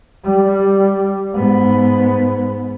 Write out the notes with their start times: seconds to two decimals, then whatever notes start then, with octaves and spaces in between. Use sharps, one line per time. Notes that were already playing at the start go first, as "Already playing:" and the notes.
0.24 G3
1.33 G#2 B3